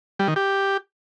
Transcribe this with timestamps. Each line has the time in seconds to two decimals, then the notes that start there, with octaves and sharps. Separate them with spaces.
0.19 G3
0.28 D#3
0.36 G4